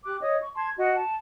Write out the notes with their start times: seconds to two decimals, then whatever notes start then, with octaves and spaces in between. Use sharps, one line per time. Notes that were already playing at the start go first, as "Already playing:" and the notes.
0.05 G4 D6 F#6
0.21 C#5 D#5 D#6
0.41 C#6
0.56 A5 C6 G#6
0.76 F#4 D#5
0.95 A5